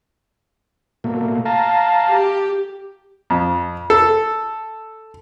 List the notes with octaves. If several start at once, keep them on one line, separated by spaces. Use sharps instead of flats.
B2 A3 A#3
F5 A5 A#5
G4
F2
A4